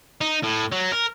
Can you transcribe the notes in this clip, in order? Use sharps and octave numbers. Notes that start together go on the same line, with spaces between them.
D#4
A2
F#3
A#4